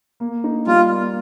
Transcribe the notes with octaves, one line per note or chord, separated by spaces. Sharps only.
A#3
D#4
G3 F4
A#3